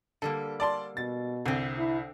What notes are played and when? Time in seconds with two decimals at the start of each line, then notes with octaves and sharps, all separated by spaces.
0.22 D3 G3 A#3 A4
0.60 D5 A5 C6
0.97 B2 A6
1.46 C2 D3 C4
1.78 E4